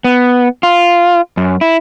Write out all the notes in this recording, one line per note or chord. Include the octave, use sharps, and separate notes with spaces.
B3
F4
F#2
E4